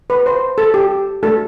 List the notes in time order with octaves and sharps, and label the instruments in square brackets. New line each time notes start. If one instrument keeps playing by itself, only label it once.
[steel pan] B4
C5
A4
G4
A3 D4 F#4 A4